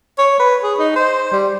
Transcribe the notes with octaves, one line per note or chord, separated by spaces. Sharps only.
C#5
B4
G#4
D#4
C5
G3